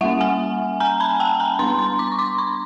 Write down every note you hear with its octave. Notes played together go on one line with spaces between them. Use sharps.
G3 A#3 C#4 E5 F#5
F#5 G#5
G#5 A#5
A5 B5
G5 A5
G#5 A#5
G3 B3 D4 A#5 C6
A#5 C6
C6 D6
C#6
C6 D6
B5 C#6